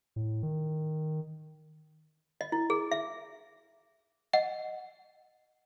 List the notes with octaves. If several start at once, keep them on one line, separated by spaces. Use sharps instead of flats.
A2
D#3
D#5
E4
G#4
E5
D#5 F#5